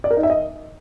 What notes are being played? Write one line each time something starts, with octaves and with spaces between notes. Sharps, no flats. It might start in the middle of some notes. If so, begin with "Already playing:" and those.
D5
A#4
D#4
E5
D#5